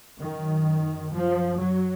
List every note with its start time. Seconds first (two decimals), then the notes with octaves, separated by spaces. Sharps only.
0.20 F#2 D#3
1.13 F#2 F3
1.59 F#3